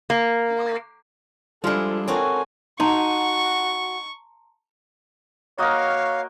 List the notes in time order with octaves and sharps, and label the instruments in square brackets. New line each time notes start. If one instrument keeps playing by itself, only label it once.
[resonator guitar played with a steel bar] A#3
[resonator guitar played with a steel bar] F3 D4 [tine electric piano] G3 [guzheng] G#3 E4 [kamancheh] A4
[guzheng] C4 D#4 F#4 [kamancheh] A4 G#5 [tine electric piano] A#4 C#5
[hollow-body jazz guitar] D#4 [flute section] F#4 F#5 [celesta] A5 A#5 C6 [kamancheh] C#6
[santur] A#3 D#5 D#6 [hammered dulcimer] F#4 A#4 [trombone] C#5 [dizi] F5